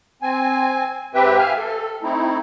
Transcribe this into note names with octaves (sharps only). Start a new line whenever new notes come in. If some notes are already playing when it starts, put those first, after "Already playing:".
C4 G#5
G#2 C4 G4 B4 E5 G5
E5 F5 G#5 F6
A4
A3 C4 D#4 E4